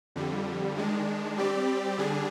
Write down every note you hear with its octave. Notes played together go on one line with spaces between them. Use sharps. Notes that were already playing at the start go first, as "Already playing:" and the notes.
F2 D3 G3
D#3 G#3 D4
G3 C4 G4 D5
D3 G3 D4 G#4